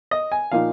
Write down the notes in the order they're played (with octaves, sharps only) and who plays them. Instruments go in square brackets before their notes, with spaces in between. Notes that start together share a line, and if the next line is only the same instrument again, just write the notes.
[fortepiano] D#5
G#5
A#2 F3 A#3 D#4 F5